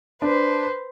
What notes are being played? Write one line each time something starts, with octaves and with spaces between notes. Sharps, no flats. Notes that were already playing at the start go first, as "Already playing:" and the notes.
D4 B4 C5